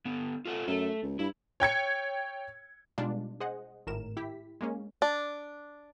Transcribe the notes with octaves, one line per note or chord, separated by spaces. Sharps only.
D3 B3
F4 A4 F#5
F#2 A3 A4
C#2
G2 E4
C#5 G5 G#6 C#7
B2 G3 G#3 D4 D#4 F4
G#4 C5 D#5 F#5
G#1 A2 A#4 E7
E4 G4 B6
G#3 A#3 C#4
D4